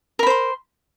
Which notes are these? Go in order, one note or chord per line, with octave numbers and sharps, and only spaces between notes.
A#4 C5 B5 C6